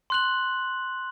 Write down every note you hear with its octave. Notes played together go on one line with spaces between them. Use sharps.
C6 F#6 F#7